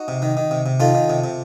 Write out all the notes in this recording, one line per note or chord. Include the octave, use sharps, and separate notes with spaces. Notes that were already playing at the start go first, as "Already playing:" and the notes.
Already playing: D#4 F#4
C3
D#3
D#3
C3
C3
D#3 F4 A4
D#3
C3
C3